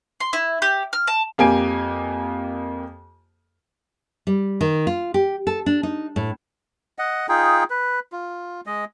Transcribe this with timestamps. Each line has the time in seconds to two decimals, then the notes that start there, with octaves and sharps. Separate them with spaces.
0.20 C6
0.33 E4
0.62 G4
0.93 F6
1.07 A5
1.38 F2 A#3 G4 G#5 D7
4.27 G3
4.61 D#3
4.87 F4
5.14 G4
5.47 A4
5.66 D4
5.83 D#4
6.16 A2
6.99 D#5 F#5
7.29 D#4 F4 G#4 G5
7.70 B4
8.12 F4
8.66 G#3 D#5